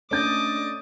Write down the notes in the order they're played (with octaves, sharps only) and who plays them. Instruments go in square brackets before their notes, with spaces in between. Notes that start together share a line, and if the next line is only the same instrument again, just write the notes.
[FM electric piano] A3 D4 A6 [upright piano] C#4 G6 [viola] D#5 D6